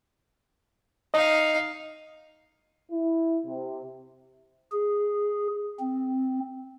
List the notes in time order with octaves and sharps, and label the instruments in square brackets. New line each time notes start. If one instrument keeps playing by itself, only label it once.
[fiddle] D#4 F5 [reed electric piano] D#5
[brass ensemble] E4
C3
[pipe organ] G#4
C4